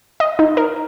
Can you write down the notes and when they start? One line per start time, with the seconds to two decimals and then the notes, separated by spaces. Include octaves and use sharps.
0.20 D#5
0.39 D#4
0.57 A#4